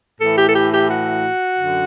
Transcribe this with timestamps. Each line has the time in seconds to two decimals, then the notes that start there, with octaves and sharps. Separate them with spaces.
0.19 A2 E3 A4
0.36 G4
0.47 A4
0.54 G4
0.71 G4
0.88 F#4
1.56 F#2 D3